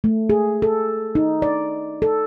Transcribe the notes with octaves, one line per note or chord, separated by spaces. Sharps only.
A3
G#4
A4
D#4
D5
A4